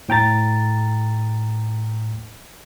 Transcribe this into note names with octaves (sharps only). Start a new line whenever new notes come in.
A2 G5 A#5 A6